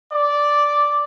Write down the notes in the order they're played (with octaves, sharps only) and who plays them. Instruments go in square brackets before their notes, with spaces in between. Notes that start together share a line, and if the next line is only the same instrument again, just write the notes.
[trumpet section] D5